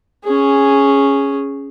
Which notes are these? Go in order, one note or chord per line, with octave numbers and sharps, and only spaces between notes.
C#4 G#4